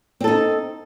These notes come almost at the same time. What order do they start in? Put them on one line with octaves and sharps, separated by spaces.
C4 A4 D#4